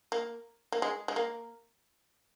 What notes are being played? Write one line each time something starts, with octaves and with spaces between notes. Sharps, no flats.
A#3
A#3
G#3
G#3
A#3